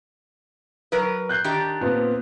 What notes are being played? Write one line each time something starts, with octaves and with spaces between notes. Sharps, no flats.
F#3 A#4 B4
F#6 G6 C7
D#3 D4 G4
A#2 B3 C4